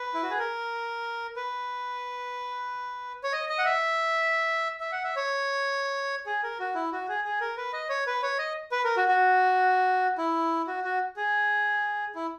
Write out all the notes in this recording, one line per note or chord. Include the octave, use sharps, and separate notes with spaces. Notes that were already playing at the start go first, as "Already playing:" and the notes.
Already playing: B4
E4
F#4
G#4
A#4
B4
C#5
D#5
D#5
F#5
E5
E5
F#5
E5
C#5
G#4
A#4
F#4
E4
F#4
G#4
G#4
A#4
B4
D#5
C#5
B4
C#5
D#5
B4
A#4
F#4
F#4
E4
F#4
F#4
G#4
E4